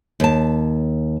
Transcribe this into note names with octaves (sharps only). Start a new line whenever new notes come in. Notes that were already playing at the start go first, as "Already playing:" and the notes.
D#2 A5